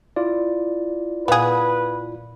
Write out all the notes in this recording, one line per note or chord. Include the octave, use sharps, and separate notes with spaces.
E4 F4 D5
A#2 B3 G#4 B4 F5 F#6